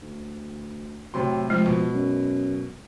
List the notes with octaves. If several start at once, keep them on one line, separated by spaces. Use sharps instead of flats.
D2
A2 C3 F#3 C6
F3 G#3
B2
F#2